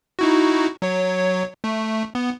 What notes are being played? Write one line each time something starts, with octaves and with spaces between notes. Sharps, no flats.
D#4 E4 F#4
F#3 C#5
A3
B3